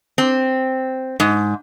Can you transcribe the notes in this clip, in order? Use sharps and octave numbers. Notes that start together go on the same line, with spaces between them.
C4
G#2